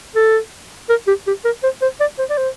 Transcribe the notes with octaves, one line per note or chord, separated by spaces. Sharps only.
A4
A#4
G4
G4
A#4
C5
C5
D5
C5
D5
C5